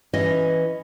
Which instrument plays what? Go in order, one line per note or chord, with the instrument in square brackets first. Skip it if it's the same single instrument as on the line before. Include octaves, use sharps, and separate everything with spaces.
[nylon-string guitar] E3 C#4 E4 D#5